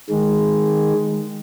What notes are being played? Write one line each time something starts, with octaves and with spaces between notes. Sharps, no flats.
D#3 G#3